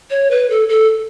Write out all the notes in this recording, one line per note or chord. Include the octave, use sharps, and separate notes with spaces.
C#5
B4
A4
A4